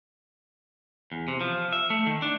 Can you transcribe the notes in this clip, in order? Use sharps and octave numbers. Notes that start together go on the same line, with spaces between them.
E2
C3
F3
E5
A3
D#3
D4